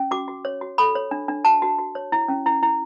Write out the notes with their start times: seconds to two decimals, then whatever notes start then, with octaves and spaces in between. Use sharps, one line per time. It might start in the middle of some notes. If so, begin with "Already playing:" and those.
Already playing: C#4
0.11 F#4 D6
0.28 F#4
0.45 C#5
0.61 F#4
0.78 A4 B5
0.95 C#5
1.11 D4
1.28 D4
1.45 F#4 A5
1.62 F#4
1.78 F#4
1.95 C#5
2.12 E4
2.28 C#4
2.46 E4
2.63 E4